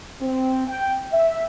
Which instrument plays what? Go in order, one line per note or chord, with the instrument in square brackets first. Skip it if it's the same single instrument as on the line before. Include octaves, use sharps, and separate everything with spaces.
[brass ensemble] C4
G5
E5